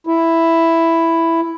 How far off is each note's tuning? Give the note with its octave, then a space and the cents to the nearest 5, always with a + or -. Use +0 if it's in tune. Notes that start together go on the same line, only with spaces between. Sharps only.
E4 +5